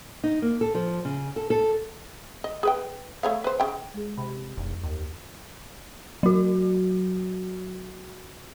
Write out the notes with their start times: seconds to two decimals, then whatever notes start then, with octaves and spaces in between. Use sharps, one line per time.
0.24 D#4
0.42 A#3
0.61 A4
0.75 F3
1.05 C#3
1.36 A4
1.50 A4
2.44 D#5
2.63 G#4 B4 G5
3.23 A3 C#5 F5
3.44 B4 C5
3.60 C#3 G5
3.94 G#3 G#4
4.18 C3 B5
4.57 E1 F2
4.84 D#2
6.23 F#3 F#4